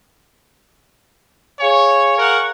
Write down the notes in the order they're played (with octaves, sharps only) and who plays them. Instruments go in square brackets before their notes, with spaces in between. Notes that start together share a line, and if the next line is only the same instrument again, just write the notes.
[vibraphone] G#4 F5 G#5 [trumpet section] C#5
[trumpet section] A#4 F#5 C#6